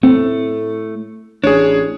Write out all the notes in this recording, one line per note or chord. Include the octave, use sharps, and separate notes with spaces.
A2 A3 C4
A1 D4 G#4 C#5